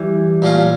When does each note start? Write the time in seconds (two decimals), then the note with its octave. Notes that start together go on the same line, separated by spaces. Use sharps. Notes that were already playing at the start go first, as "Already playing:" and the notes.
Already playing: E3 G3
0.42 A#2 A3 C#4 F4